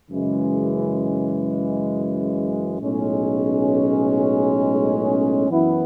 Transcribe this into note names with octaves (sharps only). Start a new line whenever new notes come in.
F#2 C#3 E3 G#3
B1 A2 G#3 C#4
F#2 E3 B3 E4